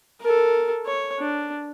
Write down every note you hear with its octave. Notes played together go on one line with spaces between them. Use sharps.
A4 A#4
C#5
D4